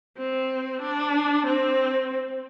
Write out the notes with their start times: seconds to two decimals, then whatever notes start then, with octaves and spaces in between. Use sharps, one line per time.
0.17 C4
0.82 D4
1.46 C4